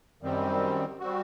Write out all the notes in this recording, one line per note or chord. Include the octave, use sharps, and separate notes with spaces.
F#2 D#3 G3 C4
G3 C4 F#4